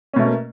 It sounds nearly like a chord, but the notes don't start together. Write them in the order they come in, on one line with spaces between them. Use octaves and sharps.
C#4 B2 A3 A#3